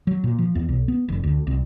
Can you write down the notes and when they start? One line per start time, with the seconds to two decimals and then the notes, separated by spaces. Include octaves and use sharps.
0.07 F#3
0.24 A#2
0.38 F3
0.55 E2
0.69 B1
0.88 B3
1.08 F1
1.23 D2
1.47 C2